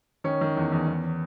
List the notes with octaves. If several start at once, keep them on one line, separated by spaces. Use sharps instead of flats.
D#3 C#4
D#3
E2
E2
E2